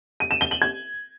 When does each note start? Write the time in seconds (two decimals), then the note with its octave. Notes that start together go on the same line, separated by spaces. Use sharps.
0.20 D#7
0.31 E7
0.41 G7
0.51 F#7
0.62 G#6